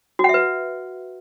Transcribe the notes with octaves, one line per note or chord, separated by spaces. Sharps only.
F#4 B4 E5 F#5